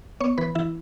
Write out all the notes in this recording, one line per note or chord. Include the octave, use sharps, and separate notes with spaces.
B3 C#5 C#6
E3 B4 B5
E3 E4 E5